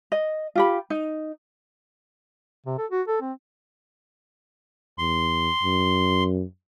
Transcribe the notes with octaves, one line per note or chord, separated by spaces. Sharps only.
D#5
F4 G4 B5
D#4
C3
A4
F#4
A4
C4
E2 C6
F#2